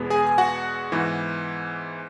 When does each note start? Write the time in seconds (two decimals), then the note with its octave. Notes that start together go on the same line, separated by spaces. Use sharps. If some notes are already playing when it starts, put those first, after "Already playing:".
Already playing: E2 B2 G#3 B3
0.10 G#4 G#5
0.27 G#5
0.38 F#4 F#5
0.92 G#2 E3 B3